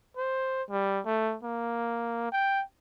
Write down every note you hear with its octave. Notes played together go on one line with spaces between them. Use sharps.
C5
G3
A3
A#3
G5